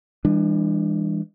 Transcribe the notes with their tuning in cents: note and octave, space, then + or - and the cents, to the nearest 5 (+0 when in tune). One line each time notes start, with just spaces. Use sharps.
E3 +0 G#3 -45 D4 +20